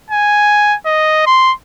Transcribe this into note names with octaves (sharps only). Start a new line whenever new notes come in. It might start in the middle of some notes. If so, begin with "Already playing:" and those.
G#5
D#5
C6